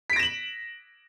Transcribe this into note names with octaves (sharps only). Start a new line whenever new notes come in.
A#6 B6 D7 E7 F#7